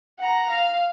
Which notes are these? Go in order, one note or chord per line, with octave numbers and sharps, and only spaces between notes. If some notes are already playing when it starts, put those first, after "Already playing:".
F#5 A#5
F5